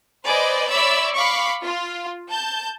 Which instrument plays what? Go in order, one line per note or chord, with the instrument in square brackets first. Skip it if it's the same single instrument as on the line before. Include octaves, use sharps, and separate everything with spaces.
[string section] B4 C5 D5 D#5 G#5
C#5 D5 E5 B5 E6
F5 B5 C#6 D6
F4
A5 G6